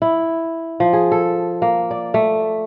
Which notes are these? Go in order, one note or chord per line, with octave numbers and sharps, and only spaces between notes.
E4
F3
G#4
A4
A#3
D5
A3